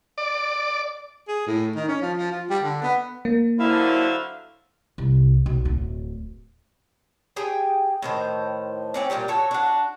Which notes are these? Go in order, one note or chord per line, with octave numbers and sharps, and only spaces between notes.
D5
G#4
A2
D#3
C#4
F3
F3
F4
G3
D3
B3
A#3
D3 F#3 E4 C5 E5 F5
C2
B1
D1
G4 G#4 G5 G#5
A2 D#3 C5
C4 C#4 D5
A#2 G3 F4 G4
F#4 A4 C#5
D4 F#4